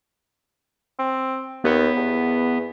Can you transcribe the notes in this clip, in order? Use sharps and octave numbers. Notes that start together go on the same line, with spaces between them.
C4
D#2 B3
E2